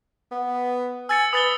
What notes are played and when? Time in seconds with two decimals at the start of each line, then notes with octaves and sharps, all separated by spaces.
0.31 B3
1.09 G#5 E6 A6 C#7
1.33 B4 D#6 A6 G7